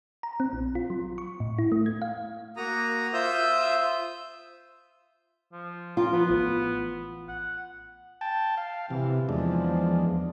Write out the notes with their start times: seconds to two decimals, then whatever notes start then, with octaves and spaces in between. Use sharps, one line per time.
0.23 A#5
0.40 C4
0.53 A#1
0.75 F4
0.90 F#3
1.18 C#6
1.40 A2
1.59 E4
1.72 A3
1.86 G#6
2.02 F5
2.57 A#3 F#4 A#5 D#6
3.13 F4 C5 E5 D#6 E6 G6
5.52 F3
5.97 F4 A#4
6.13 F3 B3
6.30 A1
7.28 F#5
8.21 G5 A5
8.57 F5
8.90 C3 E3
9.29 E2 F3 G#3 D4